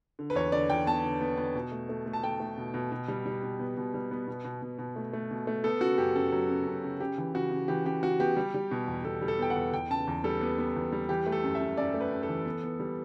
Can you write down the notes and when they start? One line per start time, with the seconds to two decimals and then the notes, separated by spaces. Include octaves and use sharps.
0.19 D3
0.30 B4
0.35 E2 C#5
0.52 D3 D5
0.70 E2 G5
0.87 B3 A5
1.04 D3
1.21 B3
1.38 B3
1.55 B2
1.72 A3
1.89 A3
2.06 A3
2.13 A5
2.23 A3 G5
2.40 A3
2.58 B2
2.74 B2
2.92 B2
3.08 G3
3.26 G3
3.43 B2
3.60 B3
3.77 B2
3.94 G3
4.11 B3
4.27 B2
4.45 B2
4.62 B2
4.78 B2
4.96 A3
5.13 A3
5.31 B2
5.47 A3
5.64 B3 A4
5.81 C#3 F#4
5.98 F#2 G4
6.15 F#2 A4
6.32 F#3
6.49 C#3
6.67 F#2
6.84 C#3
7.00 C#3 G4
7.18 E3
7.34 C#3 F#4
7.51 C#3
7.68 E3 G4
7.86 C#3 G4
8.03 C#3 F#4
8.20 B3 G4
8.37 G3
8.54 G3
8.71 B2
8.88 E2
9.05 B2 A4
9.22 G3
9.28 A4
9.39 B3 G5
9.50 F#5
9.56 E2
9.73 E2 G5
9.90 C#3 A5
10.07 E2
10.24 G3 A4
10.41 B3
10.58 B3
10.76 E2
10.92 G3
11.09 E3 G4
11.26 A3
11.32 A4
11.44 F#2
11.55 E5
11.60 F#2
11.77 F#2 D5
11.94 A3
12.01 B4
12.12 F#2
12.23 A4
12.29 E3
12.46 B3
12.63 B3
12.80 G3